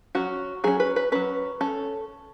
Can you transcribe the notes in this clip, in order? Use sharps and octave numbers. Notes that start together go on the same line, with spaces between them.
F#3 C#4 F#4
F#3 C#4 G#4
B4
B4
F#3 C#4 B4
C#4 A4